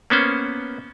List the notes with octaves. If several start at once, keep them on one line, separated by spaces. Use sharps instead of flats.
A#3 B3 C#4 C5